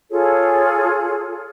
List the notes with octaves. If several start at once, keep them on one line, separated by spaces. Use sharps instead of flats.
F4 G#4 A4 C#5